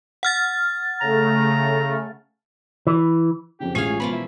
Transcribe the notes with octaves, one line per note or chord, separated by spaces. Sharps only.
F#5 F6 A6
C#3 A3 A#5
E3
F2 C#3 G4
A1 G#3 C#4 F4 G#4 F5
B2 E3 F3 A#3 B5
E4